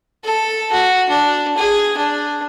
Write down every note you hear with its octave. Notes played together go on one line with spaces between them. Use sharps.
A4
F#4
D4
G#4
D4